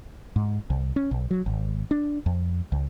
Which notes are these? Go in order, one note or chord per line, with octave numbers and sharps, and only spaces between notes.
G#2
C2
C#4
B1
F#3
G#1
D4
F2
C#2